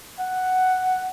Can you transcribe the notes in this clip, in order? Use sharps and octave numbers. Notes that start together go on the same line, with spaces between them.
F#5